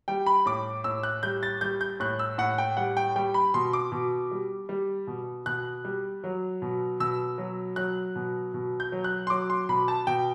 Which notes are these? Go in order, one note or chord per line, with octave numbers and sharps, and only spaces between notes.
G3 G5
B5
A2 D6
A2 E6
F#6
G3 G6
A6
G3 G6
G6
A2 F#6
E6
A2 F#5
G5
G3 F#5
G5
G3 G5
B5
B2 C6
D6
B2
G3
G3
B2
B2 F#6
G3
F#3
B2
B2 E6
F#3
F#3 F#6
B2
B2
G6
F#3
F#6
C6
F#3 D6
C6
B2 B5
A5
B2 G5